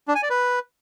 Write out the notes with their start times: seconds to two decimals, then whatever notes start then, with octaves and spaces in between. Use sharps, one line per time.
0.08 D4
0.15 G#5
0.23 D5
0.30 B4